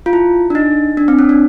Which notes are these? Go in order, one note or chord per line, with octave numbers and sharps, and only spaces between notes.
F4
E4
D4
D#4
D4
C4
C#4
D4